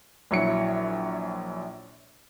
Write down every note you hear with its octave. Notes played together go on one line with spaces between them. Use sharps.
A#1 F#3 E4 C#7